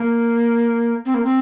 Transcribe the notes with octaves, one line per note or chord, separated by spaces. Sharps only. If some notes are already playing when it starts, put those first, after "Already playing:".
Already playing: A#3
C4
A#3
C4